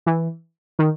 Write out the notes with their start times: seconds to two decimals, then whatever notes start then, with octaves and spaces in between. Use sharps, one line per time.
0.06 E3
0.79 D#3